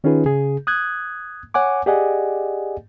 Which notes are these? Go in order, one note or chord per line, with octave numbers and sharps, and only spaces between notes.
D#3 C#4 D#4 F4 G#4 B4
C#3 G#4
D#6 F#6 G#6
C#5 F#5 G#5 D6
G4 G#4 D5 D#5 F#5 G#5